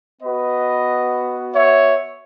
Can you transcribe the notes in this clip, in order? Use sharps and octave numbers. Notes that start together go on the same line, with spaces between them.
B3 F#4 B4 D#5
C#5 E5